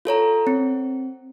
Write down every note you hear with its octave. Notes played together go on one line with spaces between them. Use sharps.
F4 A4 C#5 A#5
C4